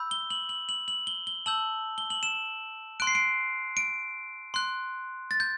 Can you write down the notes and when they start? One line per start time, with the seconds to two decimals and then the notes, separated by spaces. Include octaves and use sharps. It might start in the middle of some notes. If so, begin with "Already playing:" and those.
Already playing: B5 E6 G6
0.11 G7
0.30 F#7
0.49 F#7
0.69 F#7
0.88 F#7
1.07 G7
1.27 G7
1.46 A5 E6 G6 F#7
1.98 G7
2.10 F#7
2.23 E7
3.00 C6 F#6 D7
3.07 C7
3.15 D7
3.77 D7
4.54 C6 F#6
5.31 A6
5.40 G6